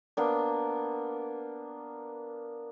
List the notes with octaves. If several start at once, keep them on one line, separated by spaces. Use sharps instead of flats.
A#3 B3 D4